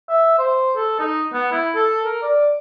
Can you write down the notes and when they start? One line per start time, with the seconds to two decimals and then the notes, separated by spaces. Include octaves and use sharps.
0.09 E5
0.38 C5
0.76 A4
0.99 D#4
1.33 B3
1.51 E4
1.75 A4
2.05 A#4
2.22 D5